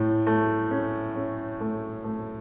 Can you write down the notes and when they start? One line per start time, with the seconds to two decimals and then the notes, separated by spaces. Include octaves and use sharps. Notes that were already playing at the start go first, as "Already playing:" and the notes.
Already playing: A2 A3
0.27 A3
0.71 C#4
1.16 C#4
1.60 A3
2.04 A3